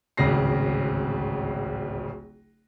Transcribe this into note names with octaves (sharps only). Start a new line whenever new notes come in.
D1 G#1 C#2 C#3 A#6 C7